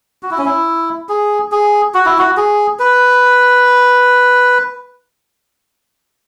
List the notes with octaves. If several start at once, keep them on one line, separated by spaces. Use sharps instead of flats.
F#4
E4
C#4
E4
G#4
G#4
F#4
E4
F#4
G#4
B4